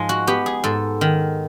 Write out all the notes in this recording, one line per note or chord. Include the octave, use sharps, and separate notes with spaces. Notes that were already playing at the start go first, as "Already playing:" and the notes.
Already playing: G#2 F3 G#3
F#4
B3 G4
G#4
G#2 A4
D#3